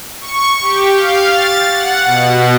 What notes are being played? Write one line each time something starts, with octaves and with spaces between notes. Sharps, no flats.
C#6
G4
F5
A6
F#5
B2